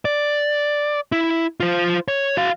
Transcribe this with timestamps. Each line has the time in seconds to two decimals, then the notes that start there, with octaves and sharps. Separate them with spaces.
0.05 D5
1.12 E4
1.60 F4 C5
2.08 C#5
2.37 F#4 F5